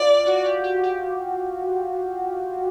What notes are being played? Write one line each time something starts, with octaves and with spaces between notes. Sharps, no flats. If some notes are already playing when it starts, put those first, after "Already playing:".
Already playing: F4 D5
F#4
G4
G4
G4